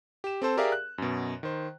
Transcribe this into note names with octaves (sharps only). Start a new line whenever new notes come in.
G4 E7
C4 A4 C5 A5
G4 G#4 A#4 D5 E5 F5
F#6
F#2 B2
D#3 C5